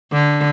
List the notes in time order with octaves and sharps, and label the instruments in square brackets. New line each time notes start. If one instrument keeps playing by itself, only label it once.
[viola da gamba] D3